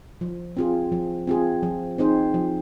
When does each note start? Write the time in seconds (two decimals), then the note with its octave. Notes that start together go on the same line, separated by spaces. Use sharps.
0.21 F3
0.57 C4 F4 G#4
0.92 F3
1.27 C4 F4 G#4
1.63 F3
1.98 C4 D#4 G#4 C5
2.34 F3